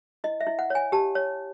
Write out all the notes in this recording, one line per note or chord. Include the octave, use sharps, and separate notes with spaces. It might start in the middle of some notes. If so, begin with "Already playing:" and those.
E4 D#5
E5
E4
F#5
C#5 G#5
G4 A5
C#5